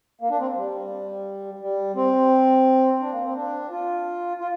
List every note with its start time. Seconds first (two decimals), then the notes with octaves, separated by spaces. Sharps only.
0.21 A#3
0.30 D4
0.39 C4
0.56 G3
1.60 G3
1.96 C4
3.00 D4
3.11 A#3
3.23 C4
3.36 D4
3.70 F4
4.39 F4